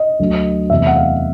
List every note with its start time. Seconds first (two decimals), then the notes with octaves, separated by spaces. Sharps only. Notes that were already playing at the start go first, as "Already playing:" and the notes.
Already playing: D#5
0.19 D2 D3 F#3 A3
0.70 E2 C3 E3 A3 E5
0.87 F#5
0.96 F5